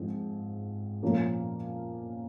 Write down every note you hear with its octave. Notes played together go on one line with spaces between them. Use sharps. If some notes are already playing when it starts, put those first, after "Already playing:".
Already playing: G#2 F3 C4
A#2 F3 A#3 C#4 F4